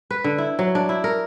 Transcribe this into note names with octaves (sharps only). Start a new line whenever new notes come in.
B4
D3
E4
F#3
D4
E4
A#4